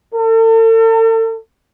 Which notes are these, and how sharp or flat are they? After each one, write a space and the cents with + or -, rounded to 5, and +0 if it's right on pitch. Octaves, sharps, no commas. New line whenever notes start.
A4 +40